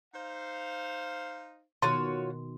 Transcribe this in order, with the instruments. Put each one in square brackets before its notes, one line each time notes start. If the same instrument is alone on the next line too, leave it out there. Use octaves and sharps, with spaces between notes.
[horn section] D#4 C5 F5
[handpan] B2 D#3 [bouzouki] F4 F#4 C#5 [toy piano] C6